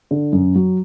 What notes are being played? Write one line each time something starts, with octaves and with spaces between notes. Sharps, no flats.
D3
F#2
F#3